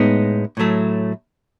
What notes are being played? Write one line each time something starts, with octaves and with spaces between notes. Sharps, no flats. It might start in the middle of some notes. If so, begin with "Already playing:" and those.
Already playing: A2 G#3 B3 D#4
A2 F#3 A3